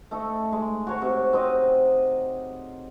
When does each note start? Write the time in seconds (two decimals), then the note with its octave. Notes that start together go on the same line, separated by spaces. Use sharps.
0.11 A3 D#4 A4
0.53 G#3
0.87 F#4 C#5 A#5
1.02 C3
1.33 C4 D#4 D#5